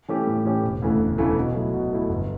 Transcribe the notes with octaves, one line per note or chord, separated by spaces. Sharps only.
E3 A3 C#4 G4
A2
E3 A3 C#4 G4
E1
D2 C#3 E3 A3
E1
D2 C#3 E3 A3
B2
F#3 A3 E4
B2
F#3 A3 E4
G1